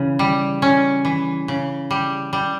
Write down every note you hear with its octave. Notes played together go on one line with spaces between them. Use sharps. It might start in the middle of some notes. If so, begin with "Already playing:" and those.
Already playing: C#3 E3
G3
C#4
E3
C#3
G3
G3